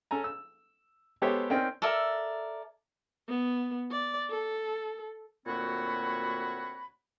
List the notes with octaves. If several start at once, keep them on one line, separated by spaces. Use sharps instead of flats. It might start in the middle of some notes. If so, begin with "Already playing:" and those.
C#4 A4 G#5 A#5
E6
G#3 B3 G4 A4 C5 C#5
C4 C#4 D#4 A#4 D5 G5
A4 A#4 D5 E5
B3
D5
A4
D2 A#2 C4 F#4 C#5 B5